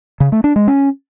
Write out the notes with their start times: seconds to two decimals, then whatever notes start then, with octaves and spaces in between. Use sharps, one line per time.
0.20 C#3
0.32 A3
0.44 D4
0.56 G#3
0.68 C#4